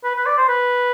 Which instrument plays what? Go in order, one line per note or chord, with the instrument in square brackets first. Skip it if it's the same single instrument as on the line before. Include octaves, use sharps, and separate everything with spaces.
[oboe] B4
B4
D5
C5
B4